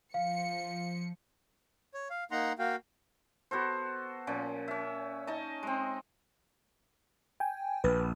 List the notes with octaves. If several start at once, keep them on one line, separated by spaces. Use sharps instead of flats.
F3 F5 C#7
C#5
F5
A#3 D#4 F#5 A#5 C6
A#3 F#4 F5 G5
B3 F#4 A4 C5
A#2 F3 C#4
C#4 E5
D#4 D#5 A5
G#3 C4
G5 G#5
A#1 B4